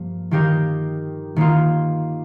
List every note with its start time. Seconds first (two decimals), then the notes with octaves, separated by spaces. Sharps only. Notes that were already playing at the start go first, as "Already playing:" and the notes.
Already playing: G2 F3 A#3
0.31 D#3 A#3 G4 A#4 D#5
1.36 D#3 A#3 F4